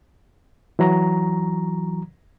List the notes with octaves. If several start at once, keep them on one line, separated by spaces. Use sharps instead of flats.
E3 F#3 A#5